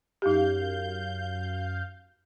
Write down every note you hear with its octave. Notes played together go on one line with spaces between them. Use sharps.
F#2 D#4 G4 F5 G6